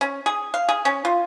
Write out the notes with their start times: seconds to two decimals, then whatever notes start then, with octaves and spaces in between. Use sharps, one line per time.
0.01 C#4
0.26 G#4
0.54 F5
0.69 G#4
0.85 C#4
1.05 F4